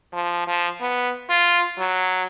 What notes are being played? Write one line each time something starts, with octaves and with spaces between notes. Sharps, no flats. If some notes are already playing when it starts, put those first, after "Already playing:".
F3
F3
B3
F4
F#3